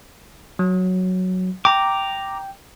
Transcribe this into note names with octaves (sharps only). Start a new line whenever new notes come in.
F#3
G5 A#5 D6